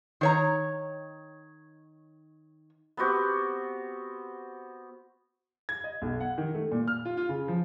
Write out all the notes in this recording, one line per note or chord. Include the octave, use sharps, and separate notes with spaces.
D#3 C#5 A#5
B3 C4 F#4 G4
G#6
D#5
B1
F#5
D#3
A3
A#2
F6
F4
F4
C#3
F3